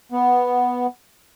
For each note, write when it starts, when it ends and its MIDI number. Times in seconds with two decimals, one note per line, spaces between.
0.12 0.87 59